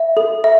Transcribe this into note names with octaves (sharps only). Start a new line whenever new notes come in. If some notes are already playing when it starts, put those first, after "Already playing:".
Already playing: E5
A4
E5